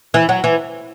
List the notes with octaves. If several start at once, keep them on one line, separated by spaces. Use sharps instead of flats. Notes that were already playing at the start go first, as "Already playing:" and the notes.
E3
F#3
E3